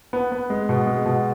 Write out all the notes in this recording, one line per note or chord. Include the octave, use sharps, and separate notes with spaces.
B3
B3
G#3
B2
G#3
B2